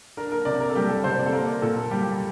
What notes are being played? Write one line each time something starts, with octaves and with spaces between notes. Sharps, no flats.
D4 A#4
A#4
C3 D5
A#4
A4
G3 G4
A4
C3 C5
D5
A4
A#3 A#4
A#2 A4
G3 G4